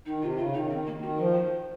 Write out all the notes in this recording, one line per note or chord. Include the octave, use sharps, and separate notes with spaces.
D#3 D#4
C3 F4
C#3 F4
D#3 D#4
D#3 C4
A#3
D#3 F#4
F3 A#4
C5